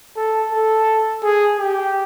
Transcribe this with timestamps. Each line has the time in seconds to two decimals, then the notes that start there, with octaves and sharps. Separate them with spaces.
0.17 A4
0.52 A4
1.23 G#4
1.58 G4